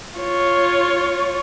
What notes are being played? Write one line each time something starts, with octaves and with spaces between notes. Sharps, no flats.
F4 C#5